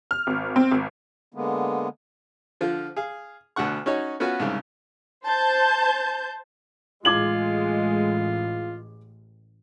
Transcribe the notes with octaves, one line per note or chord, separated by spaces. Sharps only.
F6
G#1
C4
G#1
D3 G#3 A#3 B3
D3 F3 F4
G#4 F5
D2 B2 D4 F#5 C#6
C#4 D#4 F#4 C#5
B3 C#4 F4 F#4 B4
C2 G#2 C#3
C5 A5 G6
A1 G#3 F4 D6 G#6 F#7